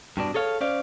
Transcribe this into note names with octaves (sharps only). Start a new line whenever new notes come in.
G2 B2 D4
G#4 A4 C#5 F5
C#4 C5 D5 F5